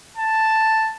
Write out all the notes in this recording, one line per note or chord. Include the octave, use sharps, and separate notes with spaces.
A5